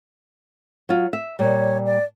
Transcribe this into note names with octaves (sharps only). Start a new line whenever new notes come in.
F#3 F4
E5
A#2 G3 C#5
D5